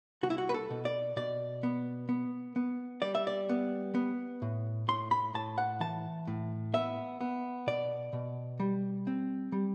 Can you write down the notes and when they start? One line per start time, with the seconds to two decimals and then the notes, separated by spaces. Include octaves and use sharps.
0.23 C2 F#4
0.30 E4
0.38 F#4
0.49 B4
0.54 A4
0.71 B2
0.85 D5
1.16 B2 D5
1.63 B3
2.09 B3
2.56 B3
3.02 G3 D5
3.15 E5
3.27 D5
3.49 B3
3.95 B3
4.42 A2
4.88 A2 C6
5.11 B5
5.34 A2 A5
5.58 F#5
5.80 E3 A5
6.28 A2
6.74 B3 E5
7.21 B3
7.67 B2 D5
8.13 B2
8.60 G3
9.07 C4
9.52 G3